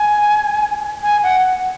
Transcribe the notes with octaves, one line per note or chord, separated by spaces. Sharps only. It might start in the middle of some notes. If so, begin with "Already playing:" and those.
Already playing: G#5
G#5
F#5